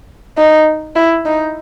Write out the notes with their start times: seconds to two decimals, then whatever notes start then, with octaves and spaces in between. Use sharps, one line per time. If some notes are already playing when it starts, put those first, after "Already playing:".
0.38 D#4
0.96 E4
1.26 D#4